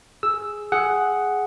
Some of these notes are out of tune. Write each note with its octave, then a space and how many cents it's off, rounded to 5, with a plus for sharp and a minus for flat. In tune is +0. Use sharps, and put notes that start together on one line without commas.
G#4 +5 E6 +0
G#4 +5 F#5 +5